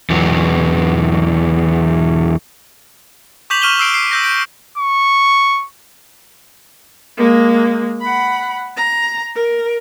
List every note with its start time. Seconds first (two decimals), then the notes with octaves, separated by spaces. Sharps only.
0.10 E2 F#3
3.50 C#6 D6 G6 B6 F7 F#7
3.62 C#6 F6 D#7 E7 F#7 G7
3.79 E6 C7 D7
3.94 C7
4.11 E6 G6 A#6
4.24 G6 D7
4.78 C#6
7.18 G#3 A#3
8.01 F#5 B5
8.77 A#5
9.35 A#4